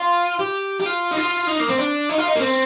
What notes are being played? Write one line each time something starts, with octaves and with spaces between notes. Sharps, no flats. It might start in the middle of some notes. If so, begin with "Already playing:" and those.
Already playing: F4
G4
G4
F4
D#4
F4
D#4
A#3
C4
D4
D#4
F4
D#4
A#3
C4